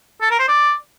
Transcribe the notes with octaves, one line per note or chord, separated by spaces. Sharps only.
A4
A#4
C5
D5